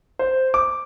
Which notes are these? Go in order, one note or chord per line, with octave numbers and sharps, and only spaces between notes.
C5
D6